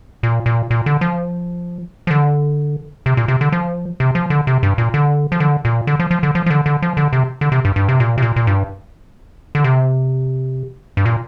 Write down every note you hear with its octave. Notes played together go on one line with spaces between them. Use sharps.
A#2
A#2
A#2
D3
F3
F3
D3
C3
A#2
C3
D3
F3
C3
F3
D3
C3
G2
A#2
D3
F3
D3
A#2
D3
F3
F3
D3
F3
F3
D3
D3
F3
D3
C3
D3
C3
G2
G2
C3
A#2
C3
A#2
A#2
G2
D3
C3
G2
A#2